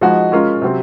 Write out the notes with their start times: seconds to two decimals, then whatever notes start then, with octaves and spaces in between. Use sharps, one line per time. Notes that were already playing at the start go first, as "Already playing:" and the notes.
0.01 F3 G#3 D#4 F#4
0.32 G#3 C#4 F4 A#4
0.62 C3 F#3 C4